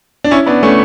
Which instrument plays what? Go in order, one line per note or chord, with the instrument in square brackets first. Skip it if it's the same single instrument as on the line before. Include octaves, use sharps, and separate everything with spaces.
[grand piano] D4
C#4 E4
B3 D4
A3 C#4